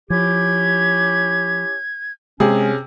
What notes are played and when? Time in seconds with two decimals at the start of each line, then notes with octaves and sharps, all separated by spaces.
0.10 F3 C#4 E4 G4 G#6
2.40 C3 G#3 C#4 G#4